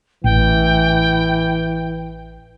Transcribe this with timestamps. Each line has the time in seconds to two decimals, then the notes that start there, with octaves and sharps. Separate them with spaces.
0.24 A1 E3 G5